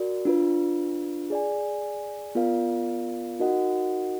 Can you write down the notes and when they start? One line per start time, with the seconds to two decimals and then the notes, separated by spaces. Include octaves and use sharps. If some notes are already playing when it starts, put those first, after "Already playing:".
Already playing: F#4 A#4 D5
0.25 D4 F4 B4
1.30 G#4 D5 G#5
2.35 B3 F4 A#4 D5 F5
3.39 D#4 F#4 A#4 D#5 F#5